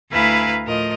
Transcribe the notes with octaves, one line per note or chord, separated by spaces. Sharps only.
D2 E4 B4 F5 G#5 A#5
A2 F3 A#4 D#5